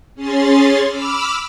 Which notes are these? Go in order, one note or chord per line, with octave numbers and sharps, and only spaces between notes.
C#4 G#4 C6 A6
B5 D6 E6 F6